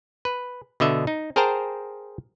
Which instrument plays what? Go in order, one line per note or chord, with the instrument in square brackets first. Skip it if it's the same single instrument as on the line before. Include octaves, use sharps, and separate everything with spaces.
[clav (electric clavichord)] B4
B2 D3 D#5 E5
D#4
G#4 A#4 C5 G5 A5 A#5